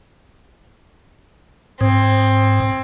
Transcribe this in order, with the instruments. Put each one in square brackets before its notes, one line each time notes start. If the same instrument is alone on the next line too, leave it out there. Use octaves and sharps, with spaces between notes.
[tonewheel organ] G#2 [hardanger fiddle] C4